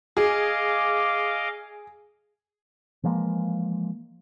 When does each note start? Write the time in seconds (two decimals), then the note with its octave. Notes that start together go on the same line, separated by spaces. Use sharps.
0.17 G#4 D#5 F5 D6
3.03 E3 F3 G#3 A#3